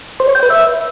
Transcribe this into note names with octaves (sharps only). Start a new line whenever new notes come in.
C5
C#5
G5
B4
E5